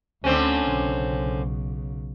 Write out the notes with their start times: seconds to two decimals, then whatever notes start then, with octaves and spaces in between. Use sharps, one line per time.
0.24 D2 D3 C4 C#4
0.71 B1 C#3